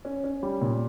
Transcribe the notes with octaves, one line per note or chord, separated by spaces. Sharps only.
C#4
C#4
G3
A#2